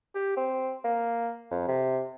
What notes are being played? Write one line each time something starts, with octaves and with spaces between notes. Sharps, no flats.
G4
C4
A#3
F2
C3